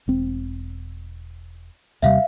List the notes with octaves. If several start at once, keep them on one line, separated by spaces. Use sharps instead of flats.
E1 C4
D#2 C3 G3 E5 F5